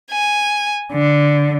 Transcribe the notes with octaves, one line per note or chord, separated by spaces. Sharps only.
G#5
D3